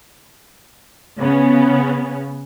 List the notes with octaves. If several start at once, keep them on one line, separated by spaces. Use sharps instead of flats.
C#3 B3 C#4